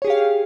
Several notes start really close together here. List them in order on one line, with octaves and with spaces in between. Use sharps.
C#5 G#4 G4 F5